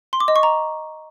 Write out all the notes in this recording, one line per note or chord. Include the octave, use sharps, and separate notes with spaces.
C6
D6
D#5
C#6
A#5